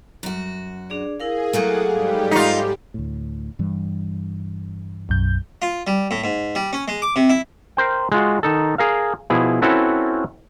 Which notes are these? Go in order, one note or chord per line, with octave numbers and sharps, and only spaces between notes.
F#2 F#4
D4 G#4 D5
E4 G#4 A#4 F5
F#3 A3 A#3 G#4 F#5
G#2 G3 G4 F5
G#3 D#4 F4
D2 A2
G2 E3 G3
B1 F#2 G6
F4
G3
A2
G#2
G3
C#4
G#3
D6
C3
E4
A#4 C5 G5
G#3 F4 F#4
D#3 D#4 A4
G#4 A#4 F5
B2 F3 E4 G#4
C4 C#4 E4 F#4 A4 B4